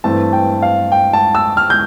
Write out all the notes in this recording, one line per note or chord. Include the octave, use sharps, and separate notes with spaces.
G2 E3 A3 C4 A5
G5
F5
G5
A5
E6
F6
G6